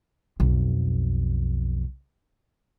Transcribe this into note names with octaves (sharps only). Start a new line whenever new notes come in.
B1 F2